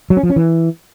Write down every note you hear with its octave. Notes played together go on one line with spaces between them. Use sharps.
F#3
C#4
F3
C#4
E3